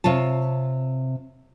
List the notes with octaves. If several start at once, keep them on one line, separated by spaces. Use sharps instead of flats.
C3 F4 C#5 A5